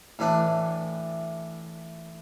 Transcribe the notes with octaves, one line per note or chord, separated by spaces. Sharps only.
A2 E3 D4